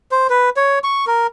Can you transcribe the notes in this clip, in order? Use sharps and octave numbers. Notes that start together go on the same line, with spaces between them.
C5
B4
C#5
C#6
A#4